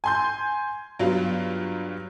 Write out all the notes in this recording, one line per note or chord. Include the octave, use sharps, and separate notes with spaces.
G#5 C6 G6
G2 F#3 B3 F4 B4